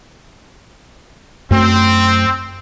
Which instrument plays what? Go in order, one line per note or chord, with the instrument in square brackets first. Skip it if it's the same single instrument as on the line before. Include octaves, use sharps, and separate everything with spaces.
[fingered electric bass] F#2 A3 [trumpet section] C4